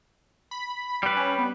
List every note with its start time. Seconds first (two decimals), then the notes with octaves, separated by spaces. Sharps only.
0.51 B5
1.03 G3 B4
1.17 C#4
1.38 B3